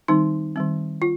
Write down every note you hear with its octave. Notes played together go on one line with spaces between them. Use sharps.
D#3 G3 C4 D#4
D#3 G3 C4
F4